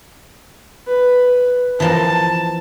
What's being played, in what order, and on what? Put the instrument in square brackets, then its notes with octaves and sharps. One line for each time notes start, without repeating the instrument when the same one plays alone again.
[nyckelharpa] B4
[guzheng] E3 F3 A#4 [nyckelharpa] A5